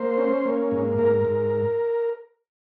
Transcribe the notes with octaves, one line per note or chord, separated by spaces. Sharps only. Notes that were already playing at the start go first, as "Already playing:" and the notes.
Already playing: A#3 C5
C#4
A#3
G#2
G#2 A#4
G#2